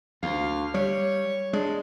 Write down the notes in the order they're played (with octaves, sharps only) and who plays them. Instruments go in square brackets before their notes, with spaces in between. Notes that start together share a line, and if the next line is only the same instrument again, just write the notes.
[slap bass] D2 [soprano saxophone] F5
[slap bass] G3 [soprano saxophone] C#5
[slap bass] G#3 [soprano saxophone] D4